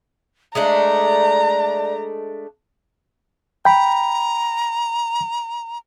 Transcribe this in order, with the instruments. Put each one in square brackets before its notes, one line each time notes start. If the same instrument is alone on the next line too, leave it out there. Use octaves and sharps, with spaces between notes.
[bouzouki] G#3 A3 D4 [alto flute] D5 [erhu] A#5
[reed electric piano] G5 B5 [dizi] A#5